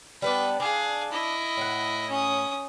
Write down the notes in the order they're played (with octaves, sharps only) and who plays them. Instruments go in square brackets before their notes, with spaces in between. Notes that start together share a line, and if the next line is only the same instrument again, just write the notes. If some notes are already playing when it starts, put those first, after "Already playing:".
[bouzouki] G3 B3 D4 [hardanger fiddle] B4
[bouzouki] D4 [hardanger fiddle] G#4 F5
[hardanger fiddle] E4 D#5
[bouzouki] A2 F#5
[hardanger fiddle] C#4 D#6